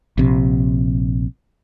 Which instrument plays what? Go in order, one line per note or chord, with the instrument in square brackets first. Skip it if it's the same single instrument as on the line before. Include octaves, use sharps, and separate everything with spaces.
[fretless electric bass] A#1 C3